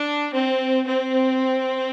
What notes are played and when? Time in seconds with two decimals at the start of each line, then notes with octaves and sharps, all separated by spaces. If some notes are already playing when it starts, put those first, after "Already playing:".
Already playing: D4
0.34 C4
0.87 C4